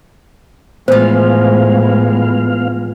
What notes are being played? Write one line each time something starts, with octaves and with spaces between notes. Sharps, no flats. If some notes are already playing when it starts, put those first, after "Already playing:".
A2 E3 F3 G#3 B3 C5 F5